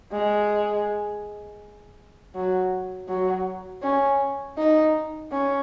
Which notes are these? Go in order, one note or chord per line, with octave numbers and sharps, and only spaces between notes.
G#3
F#3
F#3
C#4
D#4
C#4